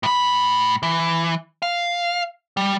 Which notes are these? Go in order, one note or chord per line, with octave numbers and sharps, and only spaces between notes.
A2 B5
E3
F5
G3